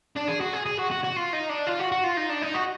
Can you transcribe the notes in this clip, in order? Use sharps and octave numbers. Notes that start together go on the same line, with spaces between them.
D4
G#4
F#4
G#4
G#4
F#4
F#4
F#4
F4
D#4
D4
F4
F#4
F#4
F4
D#4
D4
D#4
F#4